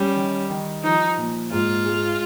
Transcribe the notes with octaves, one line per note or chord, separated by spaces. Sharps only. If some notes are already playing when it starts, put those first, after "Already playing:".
Already playing: G3 C#4
D#3
D#3
F3 D#4
A#2
G#2 F4
G#3